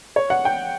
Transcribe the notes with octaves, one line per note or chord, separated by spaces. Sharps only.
C#5
F#5
G5